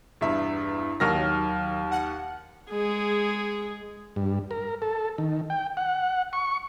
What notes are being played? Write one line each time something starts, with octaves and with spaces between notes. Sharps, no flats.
E2 G2 E5
D#2 D#3 F#3 F6 A#6
F#5
G#3 G#4
G2
A#4
A4
D#3
G5
F#5
C#6